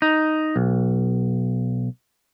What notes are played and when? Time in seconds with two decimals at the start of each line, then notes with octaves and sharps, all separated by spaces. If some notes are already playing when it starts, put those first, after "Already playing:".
0.02 D#4
0.56 B1